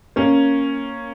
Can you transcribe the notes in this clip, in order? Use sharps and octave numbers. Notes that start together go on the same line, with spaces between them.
A#3 C#4